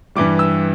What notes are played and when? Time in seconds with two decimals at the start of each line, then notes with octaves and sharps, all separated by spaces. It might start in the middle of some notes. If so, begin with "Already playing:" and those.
0.16 G2 E3 G3 D6
0.39 E6